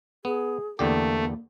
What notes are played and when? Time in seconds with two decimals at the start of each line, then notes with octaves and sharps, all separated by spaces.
0.25 B3 G#4
0.79 E2 D3 A3 A#3 G4